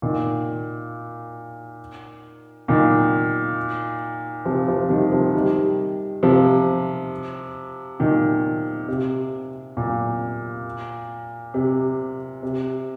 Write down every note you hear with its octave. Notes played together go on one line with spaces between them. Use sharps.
A#2 D#3
A#2 D#3
C3 F3
C3 F3
D#3 G3
C3 F3
D#3 G3
C3 F3
A#2 D#3
C3
A#2
C3
C3